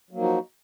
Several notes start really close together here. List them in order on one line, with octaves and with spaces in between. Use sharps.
F#3 A#3 F3 D#4 F#4